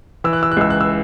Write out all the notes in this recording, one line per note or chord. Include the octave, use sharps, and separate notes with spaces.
E3 E6
F#6
E6
F#6
C#2 E6
F#6
E6